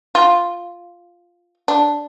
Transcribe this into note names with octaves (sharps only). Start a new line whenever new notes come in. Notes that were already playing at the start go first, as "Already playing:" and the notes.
F4
D4